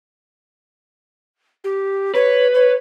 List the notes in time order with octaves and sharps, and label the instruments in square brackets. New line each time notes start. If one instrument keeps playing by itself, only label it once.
[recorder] G4
[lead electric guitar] B4 [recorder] C#5
[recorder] C#5